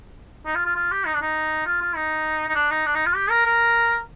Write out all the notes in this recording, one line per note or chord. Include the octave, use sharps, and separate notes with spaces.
D#4
F4
F4
F4
G4
D#4
D4
D#4
F4
F4
D#4
D#4
D4
D#4
D4
D#4
F4
G4
A#4
A#4